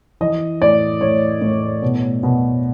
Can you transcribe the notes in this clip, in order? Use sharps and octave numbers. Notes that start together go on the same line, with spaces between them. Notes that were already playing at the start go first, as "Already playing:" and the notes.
E3 D#5
A2 D5
A2 C#5
A2
B2
B2